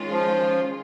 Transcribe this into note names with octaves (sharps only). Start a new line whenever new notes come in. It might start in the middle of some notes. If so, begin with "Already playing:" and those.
Already playing: D#3 G#3 C#4 F4
F3